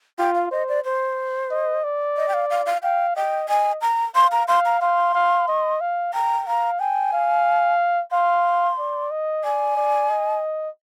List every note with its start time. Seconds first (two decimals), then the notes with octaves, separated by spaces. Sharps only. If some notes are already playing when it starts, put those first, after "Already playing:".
0.19 F4 G5
0.35 F5
0.51 C5 D#5
0.68 D5
0.85 C5
1.51 D#5
1.84 D5
2.17 D#5
2.28 G5
2.34 F5
2.50 F5
2.66 F5
2.83 F5 G5
3.16 D#5 G5
3.49 D#5 G#5
3.82 A#5
4.15 F5 C6
4.32 A#5
4.48 F5 C6
4.65 A#5
4.81 F5 C6
5.15 F5
5.48 D#5
5.81 F5
6.14 G5 A#5
6.47 F5 A#5
6.79 G5 G#5
7.13 F5
8.12 F5 C6
8.78 D5
9.11 D#5
9.44 D5 G#5
9.77 D5
10.10 D#5